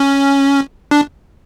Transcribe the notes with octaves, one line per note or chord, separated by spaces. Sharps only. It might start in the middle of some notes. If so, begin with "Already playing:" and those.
Already playing: C#4
D4